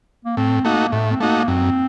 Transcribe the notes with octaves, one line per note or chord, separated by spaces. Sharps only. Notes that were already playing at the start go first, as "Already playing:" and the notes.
A#3
A2 C4
A3 A#3 D#4 F#4
A2 A3
C4
A3 A#3 D#4 F#4
F#2 C4